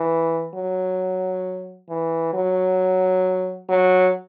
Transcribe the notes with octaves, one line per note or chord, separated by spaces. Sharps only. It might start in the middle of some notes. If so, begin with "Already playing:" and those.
Already playing: E3
F#3
E3
F#3
F#3